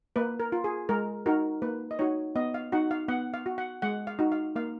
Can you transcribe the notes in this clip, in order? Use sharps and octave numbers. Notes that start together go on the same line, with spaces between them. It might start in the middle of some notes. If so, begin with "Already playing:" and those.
A#3 B4
A#4
F4
G#4
G#3 A#4
D#4 F#4 A#4
A#3 B4
D#5
D#4 F#4 C#5
B3 D#5
F5
D#4 F#4 F#5
F5
B3 F#5
F5
F#4
F#5
G#3 F#5
F5
D#4 F#4
F5
A#3 F5